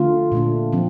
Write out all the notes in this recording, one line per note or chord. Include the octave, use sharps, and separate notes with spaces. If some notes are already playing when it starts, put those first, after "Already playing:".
Already playing: D3 A3 D4 F4
A#2 A3 D4
F3 C4